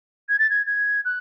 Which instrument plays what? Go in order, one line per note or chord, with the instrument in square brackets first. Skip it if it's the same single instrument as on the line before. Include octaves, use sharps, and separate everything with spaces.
[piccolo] G#6
A6
G#6
G#6
F#6